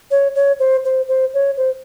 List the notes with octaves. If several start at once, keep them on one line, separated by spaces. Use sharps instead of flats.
C#5
C#5
C5
C5
C5
C#5
C5